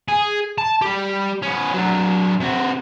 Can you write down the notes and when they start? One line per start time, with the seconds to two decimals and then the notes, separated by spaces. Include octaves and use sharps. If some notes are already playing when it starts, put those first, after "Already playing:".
0.08 G#4
0.58 A5
0.82 G3 G4
1.43 B3 C#4
1.74 F#3 D4
2.40 C3 F#4